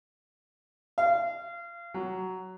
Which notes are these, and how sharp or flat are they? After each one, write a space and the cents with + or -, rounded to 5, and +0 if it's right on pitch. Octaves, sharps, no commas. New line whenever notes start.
F5 -25
F#3 +10